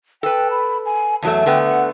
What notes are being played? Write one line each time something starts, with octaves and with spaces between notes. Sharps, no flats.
A4 B4 G5
B5
G#5
E2 F#3 A3 A5
D3 A3 B3 G5
F#5